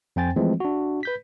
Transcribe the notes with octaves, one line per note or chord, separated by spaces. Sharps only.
F2 C4 C5 G5 G#5 A6
E3 F3 G#3 A3 C4
D4 F#4
B4 G6 B6